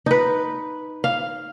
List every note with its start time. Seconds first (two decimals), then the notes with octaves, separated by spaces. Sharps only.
0.06 D#4 B4
1.04 F5